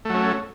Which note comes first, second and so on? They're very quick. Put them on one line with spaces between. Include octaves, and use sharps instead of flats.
A3 F#3 C#4